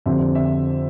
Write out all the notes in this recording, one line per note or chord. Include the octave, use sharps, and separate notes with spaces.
F2 D3 G3 C4 E5
E5